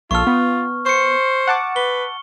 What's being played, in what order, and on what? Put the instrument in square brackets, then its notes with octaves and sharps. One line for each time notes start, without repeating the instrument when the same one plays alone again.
[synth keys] A#1 A4 [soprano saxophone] F4 [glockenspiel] C#6 F6
[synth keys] B3
[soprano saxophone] C5 [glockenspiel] C#6 C#7
[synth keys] F#5 A5 D6
[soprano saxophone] B4 [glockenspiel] G7